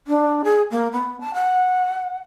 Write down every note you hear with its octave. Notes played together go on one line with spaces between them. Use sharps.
D4
G#4
A#3
B3
A5
F#5